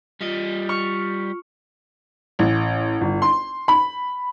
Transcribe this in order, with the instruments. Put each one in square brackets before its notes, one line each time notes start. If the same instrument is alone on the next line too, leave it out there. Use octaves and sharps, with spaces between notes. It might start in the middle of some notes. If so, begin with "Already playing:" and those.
[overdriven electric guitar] G3 D#5 [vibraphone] F4
[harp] C#6 F6
[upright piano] A1
G1
C6
B5